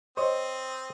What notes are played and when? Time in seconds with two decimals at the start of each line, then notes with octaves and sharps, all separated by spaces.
0.17 C4 C5 C#5 D#5 D#6